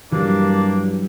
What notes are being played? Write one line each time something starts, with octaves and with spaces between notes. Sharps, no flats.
G2 E3 F#3 G3 A#3 D4